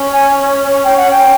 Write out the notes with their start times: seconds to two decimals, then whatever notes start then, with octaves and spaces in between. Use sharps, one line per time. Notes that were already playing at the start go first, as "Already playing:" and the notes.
Already playing: C#4
0.13 G#5
0.84 G5
0.97 F#5
1.11 G5